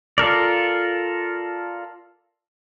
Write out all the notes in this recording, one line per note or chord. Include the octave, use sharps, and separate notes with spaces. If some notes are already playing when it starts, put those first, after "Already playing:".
F4 A4 A#4 D5